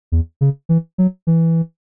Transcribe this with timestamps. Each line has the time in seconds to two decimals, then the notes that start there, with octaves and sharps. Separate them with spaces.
0.12 E2
0.41 C#3
0.69 E3
0.98 F#3
1.27 E3